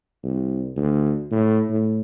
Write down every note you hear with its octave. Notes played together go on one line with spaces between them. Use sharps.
C2
D2
A2
A2